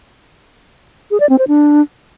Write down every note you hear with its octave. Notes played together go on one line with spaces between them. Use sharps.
G#4
D5
C4
C5
D4